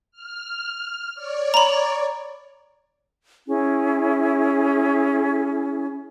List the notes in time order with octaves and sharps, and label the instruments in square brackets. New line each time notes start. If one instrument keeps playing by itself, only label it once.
[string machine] F6
C#5 D5
[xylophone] A#5 B5
[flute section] C#4 E4 G#4